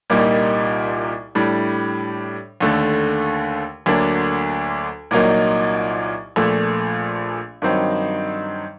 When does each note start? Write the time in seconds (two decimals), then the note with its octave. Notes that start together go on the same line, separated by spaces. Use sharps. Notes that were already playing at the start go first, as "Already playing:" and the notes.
0.10 C2 A#2 G3 A#3 D#4
1.35 A2 G3 D4
2.60 D#2 D3 A3
3.86 D2 D3 F#3 A#3 D4
5.11 C2 A#2 F#3 A#3 D#4
6.36 A#1 A#2 A3
7.62 G2 D#3 F#3 C4 D#4